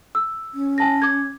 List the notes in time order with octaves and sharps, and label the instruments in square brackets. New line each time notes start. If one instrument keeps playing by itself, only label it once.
[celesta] E6
[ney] C#4
[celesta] G#5 A5 A#6
D6 G#6